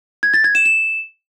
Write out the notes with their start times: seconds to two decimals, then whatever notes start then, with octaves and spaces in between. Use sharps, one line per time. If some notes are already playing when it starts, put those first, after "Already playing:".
0.23 G#6
0.34 A6
0.44 G#6
0.55 E7
0.66 E7